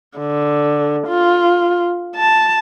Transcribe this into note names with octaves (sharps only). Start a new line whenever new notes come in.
D3
F4
A5